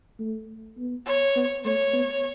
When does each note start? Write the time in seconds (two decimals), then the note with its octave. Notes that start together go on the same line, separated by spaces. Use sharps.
0.19 A3
0.78 B3
1.06 C#5
1.36 B3
1.65 A3 C#5
1.93 B3